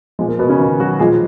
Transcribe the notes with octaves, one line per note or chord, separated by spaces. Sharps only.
A#2 F3 G#3
A#3
B2 B3
C#3 C#4
D#3 D#4
F#3 F#4
A#2 F3 G#3 G#4